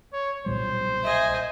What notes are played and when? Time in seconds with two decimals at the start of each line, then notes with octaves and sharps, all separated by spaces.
0.13 C#5
0.46 B1 A#2 G3 C5
1.04 D#5 E5 G#5